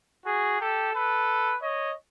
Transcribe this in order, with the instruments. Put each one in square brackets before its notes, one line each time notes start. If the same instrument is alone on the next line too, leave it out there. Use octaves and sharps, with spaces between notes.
[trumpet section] F#4 G#4
G4 A4
A4 B4
C#5 D#5